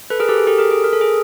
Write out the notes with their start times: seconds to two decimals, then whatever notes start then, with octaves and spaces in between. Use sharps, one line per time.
0.10 A4 B4
0.20 G#4 A#4
0.29 G4 A4
0.38 G#4
0.47 G4 A4
0.59 G#4 A#4
0.71 G#4
0.84 A#4
0.93 A4
1.01 G#4